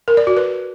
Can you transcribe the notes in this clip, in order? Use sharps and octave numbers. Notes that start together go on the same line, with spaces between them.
A#4
D5
F#4
B4